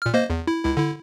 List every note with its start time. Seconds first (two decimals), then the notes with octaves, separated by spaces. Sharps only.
0.02 A#2 F6
0.14 A#3 C5 D#5
0.30 E2
0.47 E4
0.65 C#2 E4
0.77 D3 E4